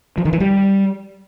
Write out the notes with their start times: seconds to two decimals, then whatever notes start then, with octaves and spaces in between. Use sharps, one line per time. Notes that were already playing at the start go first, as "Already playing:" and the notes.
0.18 F3
0.25 D#3
0.33 E3
0.40 G3